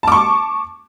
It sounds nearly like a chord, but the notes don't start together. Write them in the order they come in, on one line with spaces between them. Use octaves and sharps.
A5 D6 C#6